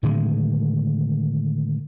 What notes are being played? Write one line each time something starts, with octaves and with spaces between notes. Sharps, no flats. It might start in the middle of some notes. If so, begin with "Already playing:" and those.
A2 D3 D#3 G#3